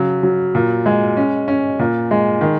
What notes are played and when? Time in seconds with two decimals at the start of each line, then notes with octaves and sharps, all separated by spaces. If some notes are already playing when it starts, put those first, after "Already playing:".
Already playing: C#3 F#3
0.23 F#3
0.55 A#2
0.86 G#3
1.17 C#4
1.48 C#4
1.79 A#2
2.11 G#3
2.41 D#3